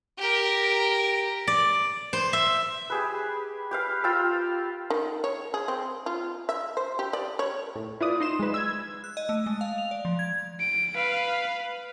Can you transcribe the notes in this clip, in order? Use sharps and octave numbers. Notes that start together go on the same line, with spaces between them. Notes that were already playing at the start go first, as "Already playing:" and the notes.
G4 A#4
D5
C5
E5
G4 G#4 B4
G4 B4 F5
F4 G5 A#5 E6
D#3
C#5
G#4
C4
F4
E5
C5
G4
D5
C#5
A2
E4 F4 B4 D5 D#6
D#4 C6 E7
G#3 B4
E6 G#6
F#6
D#5
A3
G#3
F5
F7
D5
F3
G#6
D7
B4 F5